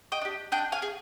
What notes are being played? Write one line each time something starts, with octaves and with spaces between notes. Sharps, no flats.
D#5 G5
D4 G4
D4 D#5 G5
F5 G#5
G#4